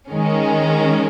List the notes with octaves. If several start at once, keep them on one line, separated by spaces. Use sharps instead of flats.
D#3 G#3 C#4